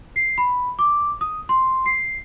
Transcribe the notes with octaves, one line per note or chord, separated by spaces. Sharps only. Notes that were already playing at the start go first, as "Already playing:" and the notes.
C7
B5
D6
D#6
C6
C7